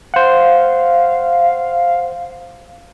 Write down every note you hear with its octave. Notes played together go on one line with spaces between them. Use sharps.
C5 F5 F#5